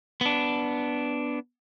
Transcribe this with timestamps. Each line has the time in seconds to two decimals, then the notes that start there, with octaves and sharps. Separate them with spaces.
0.21 B3 D4